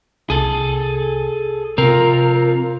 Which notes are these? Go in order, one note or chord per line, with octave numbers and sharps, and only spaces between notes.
C2 G#4 A4
C3 C4 F4 A#4